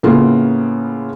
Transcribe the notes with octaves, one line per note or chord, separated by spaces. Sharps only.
A2 C#3 A#3 B3 F4